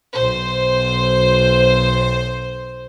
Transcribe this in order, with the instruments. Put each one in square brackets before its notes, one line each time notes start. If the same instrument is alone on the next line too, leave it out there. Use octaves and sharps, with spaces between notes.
[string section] B1 C5